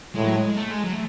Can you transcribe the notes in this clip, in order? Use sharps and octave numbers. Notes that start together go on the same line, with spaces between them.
A2 G#3
F#3
G#3
A3
G#3
F#3
A3